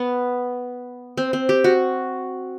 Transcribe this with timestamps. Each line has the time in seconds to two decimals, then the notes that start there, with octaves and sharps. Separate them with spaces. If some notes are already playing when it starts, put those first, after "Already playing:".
Already playing: B3
1.17 C4
1.33 C4
1.49 G4
1.64 F#4